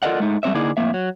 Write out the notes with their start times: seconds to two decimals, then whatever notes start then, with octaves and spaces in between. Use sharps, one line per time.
0.03 F4 A4 A#4 D5 D#5 F#5
0.20 G#3 A3 D#4
0.43 G3 A3 C4 C#5 E5
0.54 D3 A#3 D#4 E4 G#4 D5
0.77 F2 A2 A#3 E5
0.94 F#3